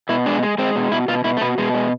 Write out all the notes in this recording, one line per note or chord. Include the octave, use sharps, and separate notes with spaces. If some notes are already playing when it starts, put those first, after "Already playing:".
B2 E4
G#3 D4
G#3
G#3 C4
B2
B2 E4
B2 F4
B2 E4
A3
B2 B3
B2 G#3
G#3